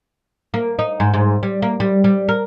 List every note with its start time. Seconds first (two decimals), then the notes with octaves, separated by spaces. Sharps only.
0.54 A#3
0.79 D#4
1.00 G#2
1.14 G#2
1.43 G3
1.62 A#3
1.80 G3
2.04 G3
2.29 A#4